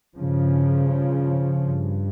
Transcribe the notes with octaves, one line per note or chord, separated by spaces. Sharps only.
G2 C#3 F3
G2